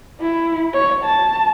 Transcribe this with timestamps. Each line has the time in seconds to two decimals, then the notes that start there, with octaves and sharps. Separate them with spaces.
0.21 E4
0.74 C#5
1.04 A5